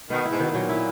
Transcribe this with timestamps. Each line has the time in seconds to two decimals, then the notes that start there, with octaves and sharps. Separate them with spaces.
0.10 B2 D#3 B3
0.25 E4
0.31 G#2
0.40 B2 D#3
0.50 A#2 F#3
0.69 E4